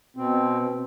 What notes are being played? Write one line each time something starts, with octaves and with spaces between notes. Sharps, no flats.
B2 C4